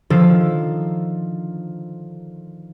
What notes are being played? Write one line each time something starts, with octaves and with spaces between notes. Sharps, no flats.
D3 D#3 F3 F4 A4